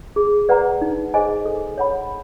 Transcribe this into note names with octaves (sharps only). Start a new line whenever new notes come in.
G#4
B4 D5 F#5 A#5
D#4
G#4 C5 D#5 G#5
A4
C#5 F#5 B5